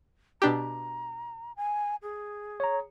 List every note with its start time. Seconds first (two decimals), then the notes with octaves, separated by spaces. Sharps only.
0.42 B2 D4 G4 A#5
1.57 G#5
2.03 G#4
2.60 C#5 A#5